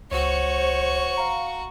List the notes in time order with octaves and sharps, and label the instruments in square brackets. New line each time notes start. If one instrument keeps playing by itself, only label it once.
[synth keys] C#2 [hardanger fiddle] F#4 C#6 [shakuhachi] C5 [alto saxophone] C#5
[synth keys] F5 A#5